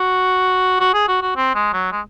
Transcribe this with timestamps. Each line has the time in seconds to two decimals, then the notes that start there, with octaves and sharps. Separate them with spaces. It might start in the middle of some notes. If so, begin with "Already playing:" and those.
Already playing: F#4
0.80 F#4
0.94 G#4
1.08 F#4
1.22 F#4
1.36 C4
1.55 G#3
1.73 F#3
1.92 G#3